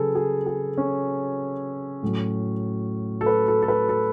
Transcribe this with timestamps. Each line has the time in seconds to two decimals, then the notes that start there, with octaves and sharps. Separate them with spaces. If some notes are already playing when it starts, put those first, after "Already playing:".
Already playing: C#3 F#3 G#4 A4 B4
0.15 G#4
0.46 G#4
0.77 C#4
2.03 A2 F#3
3.21 A4
3.26 B4
3.48 A4
3.62 A4
3.68 B4
3.89 A4